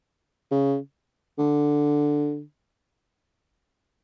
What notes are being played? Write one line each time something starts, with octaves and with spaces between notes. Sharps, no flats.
C#3
D3